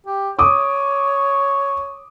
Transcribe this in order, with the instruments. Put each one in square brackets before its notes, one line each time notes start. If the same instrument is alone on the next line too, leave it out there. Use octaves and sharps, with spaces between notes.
[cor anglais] G4
[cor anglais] C#5 [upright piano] D6 D#6